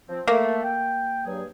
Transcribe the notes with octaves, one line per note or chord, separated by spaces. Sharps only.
F3 C4
A3 A#3
G5
G2 F#3 G#4